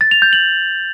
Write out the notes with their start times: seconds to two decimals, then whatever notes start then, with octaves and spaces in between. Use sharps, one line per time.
0.01 A6
0.11 F7
0.22 G6
0.33 F#7